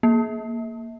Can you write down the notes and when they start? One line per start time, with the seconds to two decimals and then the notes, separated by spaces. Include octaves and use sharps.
0.03 A#3